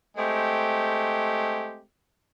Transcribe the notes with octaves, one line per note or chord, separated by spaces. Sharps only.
G#3 A3 C4 G4